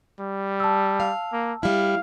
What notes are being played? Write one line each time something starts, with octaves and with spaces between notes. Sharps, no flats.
G3
A5 E6
F5
A#3
G3 E4 F5